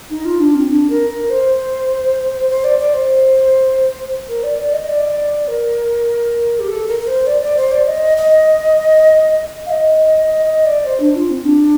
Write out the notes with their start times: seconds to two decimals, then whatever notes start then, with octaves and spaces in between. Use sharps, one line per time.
0.10 D#4
0.25 F4
0.40 D4
0.55 C4
0.70 D4
0.90 A#4
1.10 A#4
1.30 C5
2.49 C5
2.64 D5
2.79 D5
2.94 C5
4.28 A#4
4.43 D5
4.58 D5
4.73 D#5
4.88 D5
5.48 A#4
6.59 G4
6.68 A4
6.87 A#4
7.00 A#4
7.07 C5
7.27 D5
7.42 D5
7.57 C5
7.72 D5
7.87 D#5
8.17 D#5
9.66 F5
9.70 D#5
10.26 D#5
10.46 D#5
10.65 D5
10.85 C5
11.00 D4
11.15 F4
11.30 C4
11.45 D4